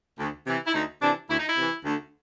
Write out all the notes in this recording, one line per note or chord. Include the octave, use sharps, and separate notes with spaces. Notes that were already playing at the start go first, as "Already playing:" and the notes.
D2
C3 E3
E4
D2 D#4
C3 E3 D4
D2 E4
D#4
E4
C3 E3
D2